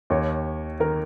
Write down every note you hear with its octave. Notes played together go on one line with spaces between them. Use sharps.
D#2 D#3 C#5
D#3 A#4